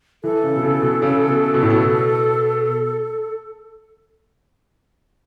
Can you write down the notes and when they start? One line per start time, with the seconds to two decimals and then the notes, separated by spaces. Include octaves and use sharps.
0.24 E3 A4
0.44 C#3
0.56 B2
0.62 C#3
0.82 B2
1.02 C#3
1.28 B2
1.54 B2
1.62 A2
1.70 B2